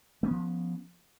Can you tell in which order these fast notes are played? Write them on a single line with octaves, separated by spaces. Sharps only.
A3 C#4 B3 F3